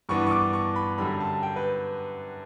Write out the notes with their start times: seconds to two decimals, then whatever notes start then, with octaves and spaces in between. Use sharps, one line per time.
0.09 G2 E3 B3 D4 C#6
0.27 C#6
0.31 D6
0.53 C#6
0.76 B5
0.98 F#2 D3 G3 B5
1.21 A5
1.43 G5
1.56 B4